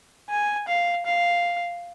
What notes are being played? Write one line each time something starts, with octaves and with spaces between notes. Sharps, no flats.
G#5
F5
F5